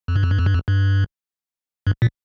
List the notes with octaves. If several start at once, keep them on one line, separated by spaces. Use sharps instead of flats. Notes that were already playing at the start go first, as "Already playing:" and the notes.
F2
G2
F2
G2
F2
G2
F2
G2
G2
A#2